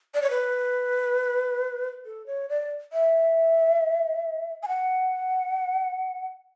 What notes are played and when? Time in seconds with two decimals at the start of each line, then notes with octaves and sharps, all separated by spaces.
0.14 D5
0.22 C#5
0.30 B4
2.05 A4
2.26 C#5
2.49 D5
2.93 E5
4.63 G#5
4.68 F#5